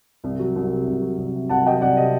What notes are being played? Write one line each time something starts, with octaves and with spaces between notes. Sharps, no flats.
C2
F#3
C2
C3
C2
F#3
C2
C3
C2 F#5 A5
F#3 D#5 G5
C2 D5 F#5
C3 D#5